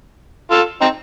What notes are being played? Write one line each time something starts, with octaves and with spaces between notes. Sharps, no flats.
F4 A4
C4 D#4